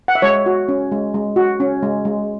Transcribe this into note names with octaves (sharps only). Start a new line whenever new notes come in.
F#5
E5
G#3 C#5
F#4
C#4
G#3
G#3
F#4
C#4
G#3
G#3